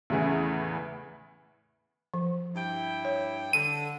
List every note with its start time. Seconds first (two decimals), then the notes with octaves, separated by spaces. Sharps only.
0.10 E2 A2 C#3 E3
2.14 F3
2.55 G2 E4 G5
3.05 C#5
3.53 D3 D#7